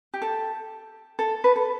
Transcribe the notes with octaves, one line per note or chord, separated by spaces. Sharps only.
G4
A4
A4
B4
A4